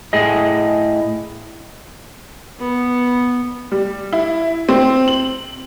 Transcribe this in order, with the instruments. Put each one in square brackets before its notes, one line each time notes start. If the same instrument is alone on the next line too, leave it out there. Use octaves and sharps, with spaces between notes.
[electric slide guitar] A2 G#4 D#5
[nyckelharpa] B3
[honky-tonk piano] G3
E4
C4
F#7